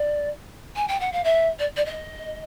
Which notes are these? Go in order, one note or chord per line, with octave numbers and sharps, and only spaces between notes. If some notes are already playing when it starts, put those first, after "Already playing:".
Already playing: D5
G#5
G5
F#5
F5
E5
D5
D5
D#5